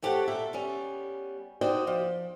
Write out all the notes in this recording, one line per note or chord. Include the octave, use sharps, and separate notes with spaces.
A3 C4 G4 A4 C#5 F#5
A#2 A4 E5
G3 B3 C#4
D#4 F#4 C5 D5 D#5 G5
F3